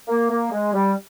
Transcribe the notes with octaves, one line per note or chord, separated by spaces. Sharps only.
A#3
A#3
G#3
G3